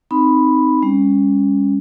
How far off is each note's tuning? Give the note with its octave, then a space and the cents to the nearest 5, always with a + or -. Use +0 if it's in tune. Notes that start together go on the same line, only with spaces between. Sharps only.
C4 +0 D#4 +0 B5 +0
G3 +45 C#4 +0